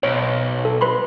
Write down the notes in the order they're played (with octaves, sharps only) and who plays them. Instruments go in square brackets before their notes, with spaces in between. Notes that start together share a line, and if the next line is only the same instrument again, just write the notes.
[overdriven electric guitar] B1 [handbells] C#5
[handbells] A4
B4 B5 C6